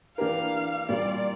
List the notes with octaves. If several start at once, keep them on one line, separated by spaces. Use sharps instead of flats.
E3 A#3 D4 G4 A#4 F5
A#2 G3 A#3 D5